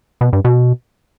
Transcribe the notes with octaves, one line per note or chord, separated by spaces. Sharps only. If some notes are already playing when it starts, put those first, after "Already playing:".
B2
G2
B2